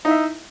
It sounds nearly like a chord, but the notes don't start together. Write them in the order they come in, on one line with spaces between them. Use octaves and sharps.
D#4 E4 E5